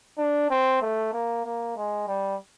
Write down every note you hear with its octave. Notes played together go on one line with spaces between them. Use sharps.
D4
C4
A3
A#3
A#3
G#3
G3